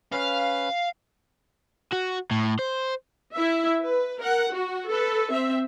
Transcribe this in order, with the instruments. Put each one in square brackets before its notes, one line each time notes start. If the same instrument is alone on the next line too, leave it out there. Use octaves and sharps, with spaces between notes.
[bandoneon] C#4 B4 [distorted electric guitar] F5
[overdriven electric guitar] F#4
A2
C5
[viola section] E4 E5
B4
A#4 F#5
F#4
A4 B4
C4 E5